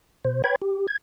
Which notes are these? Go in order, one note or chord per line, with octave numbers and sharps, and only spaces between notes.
B2 C5
B4 C#5 G5 B5 G#6
G4
G#6